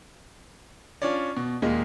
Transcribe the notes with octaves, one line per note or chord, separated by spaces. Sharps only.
C#4 D4 F4 C#5 D5
B2
D#2 A#2 G#3 A#3 D#5